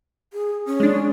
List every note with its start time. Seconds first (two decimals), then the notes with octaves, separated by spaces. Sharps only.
0.33 G#4
0.66 C#4
0.80 G#3 D4